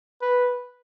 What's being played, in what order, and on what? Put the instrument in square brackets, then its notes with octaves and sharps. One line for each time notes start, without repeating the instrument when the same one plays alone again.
[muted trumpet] B4